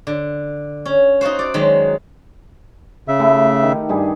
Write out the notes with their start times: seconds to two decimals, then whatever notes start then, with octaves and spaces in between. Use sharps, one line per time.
0.07 D3
0.86 C#4
1.21 D#4 F4 F#4 C5
1.39 D5
1.54 D#3 F#3 G#3
3.08 C#3 E5
3.19 A3 E4 G4
3.63 D#3
3.89 G2 G3 G#4